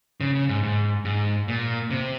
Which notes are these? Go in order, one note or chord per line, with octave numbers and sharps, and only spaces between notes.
C#3
C#3
G#2
G#2
G#2
A#2
C3